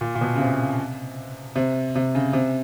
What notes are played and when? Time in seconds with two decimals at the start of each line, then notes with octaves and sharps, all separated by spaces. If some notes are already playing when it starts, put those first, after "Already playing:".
0.01 A#2
0.15 A#2
0.21 B2
0.36 C#3
0.40 C3
1.56 C3
1.96 C3
2.15 C#3
2.33 C3